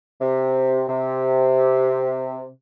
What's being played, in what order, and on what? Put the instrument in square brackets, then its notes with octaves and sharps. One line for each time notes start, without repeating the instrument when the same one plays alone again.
[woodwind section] C3
C3